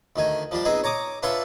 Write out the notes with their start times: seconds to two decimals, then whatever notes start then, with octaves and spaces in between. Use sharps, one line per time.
0.16 D2 D#3 D#4 G#5
0.51 F3 G3 D4 G4
0.65 B3 C4 D#4 G#4 D#5
0.84 C#5 A#5 D6 D#6
1.23 D4 F4 B4 C#5 E5 C6